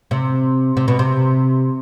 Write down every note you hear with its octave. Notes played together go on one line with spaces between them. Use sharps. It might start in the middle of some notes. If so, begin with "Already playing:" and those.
C3
C3
B2
C3